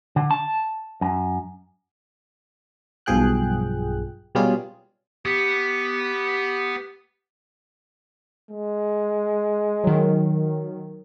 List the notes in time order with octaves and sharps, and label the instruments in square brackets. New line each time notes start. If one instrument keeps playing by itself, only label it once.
[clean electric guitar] D3
A5
F#2
[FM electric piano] B1 G2 F3 G#4 G5 F#6
B2 G3 G#3 C#4 F4 G#4
[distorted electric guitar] B3 [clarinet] G4
[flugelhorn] G#3
[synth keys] D#3 F#3